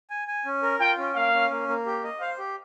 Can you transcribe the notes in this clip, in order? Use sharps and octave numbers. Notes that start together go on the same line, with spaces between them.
G#5
G#5
C#4
A#4
F4 G5
C#4
A#3 F5
C#4
A#3
A#3
G4
D#5
C5 F5
G4